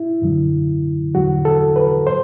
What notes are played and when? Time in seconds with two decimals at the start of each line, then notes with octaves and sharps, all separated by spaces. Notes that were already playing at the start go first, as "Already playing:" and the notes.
Already playing: E4
0.22 F#2 D3 F#3
1.14 E2 D3 F#3 F#4
1.45 A4
1.76 B4
2.07 C5